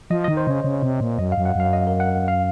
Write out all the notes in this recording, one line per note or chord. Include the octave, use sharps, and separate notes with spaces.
F3 D#5
D#3 D#5
C5
C#3 C#5
C#3
C3
A#2
F#2 D#5
F5
F#2
F#5
F#2 F5
D#5
A#4
F#5
F5